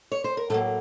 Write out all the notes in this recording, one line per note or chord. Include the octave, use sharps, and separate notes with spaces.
C#5
C5
A#4
A2 F#3 A3 A#3 A4